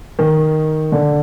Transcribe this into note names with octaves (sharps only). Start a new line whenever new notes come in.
D#3
D3